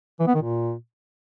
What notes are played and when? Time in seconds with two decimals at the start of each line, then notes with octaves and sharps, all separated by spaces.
0.20 E3
0.27 B3
0.35 D#3
0.42 A#2